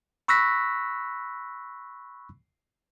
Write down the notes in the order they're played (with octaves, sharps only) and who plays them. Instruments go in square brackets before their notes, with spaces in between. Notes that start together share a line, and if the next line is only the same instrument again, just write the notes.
[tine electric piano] B5 C#6 E6 F#6 A#6 B6